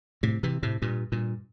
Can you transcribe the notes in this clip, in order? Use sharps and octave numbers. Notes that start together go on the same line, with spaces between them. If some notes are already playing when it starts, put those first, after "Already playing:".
A2 C3
C3 E3
A2 C3
G2 A#2
G2 A#2